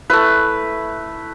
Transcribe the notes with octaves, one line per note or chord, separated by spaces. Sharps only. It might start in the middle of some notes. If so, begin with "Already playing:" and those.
A3 E4 B4